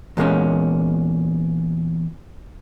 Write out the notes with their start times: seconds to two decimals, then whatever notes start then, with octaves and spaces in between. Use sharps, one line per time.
0.17 E2 A#2 G#3 A#3 C#4